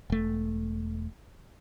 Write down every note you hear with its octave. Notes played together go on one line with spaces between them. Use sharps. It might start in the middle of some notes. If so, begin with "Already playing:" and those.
E1 A3